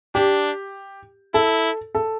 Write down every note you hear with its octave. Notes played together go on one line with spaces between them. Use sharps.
D4 G4
E4 A4
A4